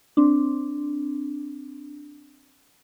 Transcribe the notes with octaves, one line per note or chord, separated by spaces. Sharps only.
C4 D4